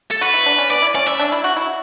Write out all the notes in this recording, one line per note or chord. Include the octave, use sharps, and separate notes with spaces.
A4
F#4 B4
E4
D4
C#4
B3 D5
E4
C#4 D5
C#4 E5
D4
E4
F#4
E4